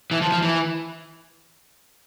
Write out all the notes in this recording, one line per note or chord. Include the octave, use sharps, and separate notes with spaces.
E3
F3
F3
E3